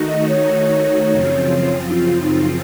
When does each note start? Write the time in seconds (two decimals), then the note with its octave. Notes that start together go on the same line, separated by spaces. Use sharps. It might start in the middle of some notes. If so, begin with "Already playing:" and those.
Already playing: D#3 A3 D#4 F#4
0.08 D#5
0.29 C#5
1.11 F#2 C#3 F3 C4 F4
1.90 D#4
1.94 F4
2.23 D#4